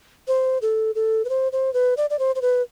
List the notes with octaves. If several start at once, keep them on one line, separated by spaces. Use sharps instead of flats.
C5
A4
A4
B4
C5
C5
B4
D5
D5
C5
C5
B4